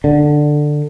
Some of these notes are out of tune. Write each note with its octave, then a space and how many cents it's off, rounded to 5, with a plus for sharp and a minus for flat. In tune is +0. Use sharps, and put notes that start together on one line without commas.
D3 +10